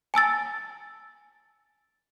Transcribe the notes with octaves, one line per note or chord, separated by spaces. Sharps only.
G#5 A5 E6 A6